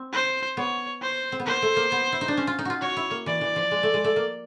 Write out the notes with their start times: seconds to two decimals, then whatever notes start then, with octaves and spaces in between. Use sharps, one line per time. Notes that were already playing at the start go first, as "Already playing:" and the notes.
Already playing: C4
0.13 C5
0.57 B3 C#5
1.02 C5
1.32 C4
1.40 B3
1.46 A#3 C5
1.62 A3
1.76 A#3
1.92 B3
2.12 E4
2.21 D#4
2.28 D4
2.37 C#4
2.47 F4
2.59 D#4
2.65 F4 F#4
2.81 F#4 C#5
2.96 E4
3.11 A#3
3.26 E3 D5
3.41 E3
3.56 F3
3.71 G#3
3.83 A3
3.94 G#3
4.04 A3
4.16 A#3